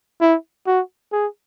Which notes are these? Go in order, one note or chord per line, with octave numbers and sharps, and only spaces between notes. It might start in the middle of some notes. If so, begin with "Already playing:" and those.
E4
F#4
G#4